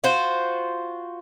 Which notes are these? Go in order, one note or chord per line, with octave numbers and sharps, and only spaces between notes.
F4 F#4 C5